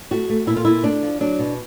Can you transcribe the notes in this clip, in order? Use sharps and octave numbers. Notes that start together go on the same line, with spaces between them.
A3 F#4
A3
A#2 E4
F4
A#2 E4
A3 D4
F3
F#3 D4
B2